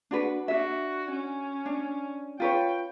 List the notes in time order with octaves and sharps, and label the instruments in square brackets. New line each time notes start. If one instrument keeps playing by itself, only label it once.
[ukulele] D4 F#4 B4
[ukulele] D4 F4 E5 [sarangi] F#4
[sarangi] C#4
[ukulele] D4
[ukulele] F4 B4 C#5 [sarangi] G5